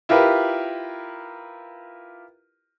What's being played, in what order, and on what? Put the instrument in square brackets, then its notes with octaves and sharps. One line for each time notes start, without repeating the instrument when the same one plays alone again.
[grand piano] E4 F4 G4 A#4 B4